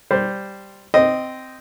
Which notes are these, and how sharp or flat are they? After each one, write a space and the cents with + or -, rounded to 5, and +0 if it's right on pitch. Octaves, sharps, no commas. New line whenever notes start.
G3 +0 C5 +0
C4 -10 D#5 -5